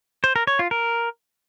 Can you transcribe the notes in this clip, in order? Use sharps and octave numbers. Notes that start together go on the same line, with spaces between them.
C5
A#4
C#5
F4
A#4